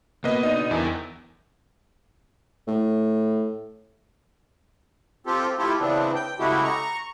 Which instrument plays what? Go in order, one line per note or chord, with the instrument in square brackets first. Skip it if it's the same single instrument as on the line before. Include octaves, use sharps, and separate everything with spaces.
[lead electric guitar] B2 [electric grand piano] A#3 B4 D#5
[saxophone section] D3 D#4 [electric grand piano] D#5
[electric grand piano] E2 [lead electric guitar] E4 A#4
[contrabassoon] A2
[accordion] C4 F4 G4 A4
A3 E4 F4 G4 A4
C#3 E3 B3 C4 D4
G5
C#3 G#3 A3 E4 F#4 G4
A#5 C#6